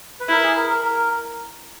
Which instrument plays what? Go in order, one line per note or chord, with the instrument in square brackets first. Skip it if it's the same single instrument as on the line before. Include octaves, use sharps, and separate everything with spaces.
[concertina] B4
[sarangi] E4 [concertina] A#4
[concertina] G#4
A#4
A#4
A#4